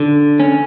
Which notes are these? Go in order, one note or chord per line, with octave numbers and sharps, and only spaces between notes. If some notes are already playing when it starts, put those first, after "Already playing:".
Already playing: D3
C#4